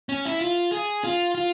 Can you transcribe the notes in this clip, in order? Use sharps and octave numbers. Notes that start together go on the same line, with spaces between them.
C#4
E4
F4
G#4
F4
F4